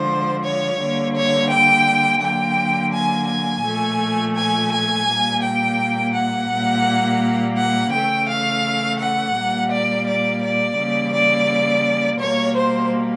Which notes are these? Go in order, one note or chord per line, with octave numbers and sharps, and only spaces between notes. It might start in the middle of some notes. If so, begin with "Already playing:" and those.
Already playing: D3 F3 G#3 C5
C#5
D3 G3 A#3
C#5
G5
D3 F#3 A#3 G5
G#5
G#5
A#2 F3 A3
G#5
G#5
A#2 G3 A#3
G5
F#5
A#2 G3 A#3
F#5
C#3 E3 A3 G5
F5
F#5
A#2 G3 A#3
D5
D5
D5
C#3 E3 G3 A#3
D5
B2 G3 A#3 C#5
C5